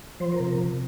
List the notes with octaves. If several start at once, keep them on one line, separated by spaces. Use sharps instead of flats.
F3 C5
A#4
C3
A#4
C3